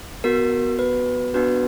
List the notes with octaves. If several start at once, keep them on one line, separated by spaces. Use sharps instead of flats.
B3 F#4 A#4
B4
B3 D4 F#4 B4